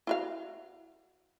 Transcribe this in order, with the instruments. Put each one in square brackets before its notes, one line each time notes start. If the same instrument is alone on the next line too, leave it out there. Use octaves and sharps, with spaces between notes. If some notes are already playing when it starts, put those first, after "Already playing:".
[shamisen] E4 F#4 F5